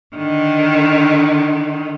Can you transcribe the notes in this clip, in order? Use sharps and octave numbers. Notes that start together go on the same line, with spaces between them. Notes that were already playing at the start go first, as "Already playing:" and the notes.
D3 D#3